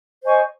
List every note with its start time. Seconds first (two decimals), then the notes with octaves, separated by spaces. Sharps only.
0.24 C5 D#5 G#5 C#6